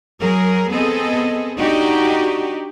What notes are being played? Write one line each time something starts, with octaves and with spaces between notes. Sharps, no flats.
F#3 G#4 A#4
B3 C4 G#4 A4 D#5
D4 D#4 F#4 G4